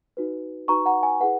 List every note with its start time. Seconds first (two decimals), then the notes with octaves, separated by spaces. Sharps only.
0.17 D#4 F#4 B4
0.68 D#4 F#4 B4 A#5 C#6
0.86 F#5 A#5
1.03 G#5
1.20 E4 G#4 B4 F#5